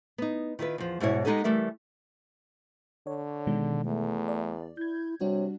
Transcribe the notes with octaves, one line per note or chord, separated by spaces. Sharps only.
B3 D#4
D#3 E4 F4 B4
E2 F3
G#2 B2 G3 E4 C#5
G#3 B3 D#4 G4 A4 G#5
E3 G3 A3 A#4 E5
D3 C#5
B2 D#3 G#3
E2 A3
D5
E4 G6 G#6
C3 G3 D4 F#4 C#5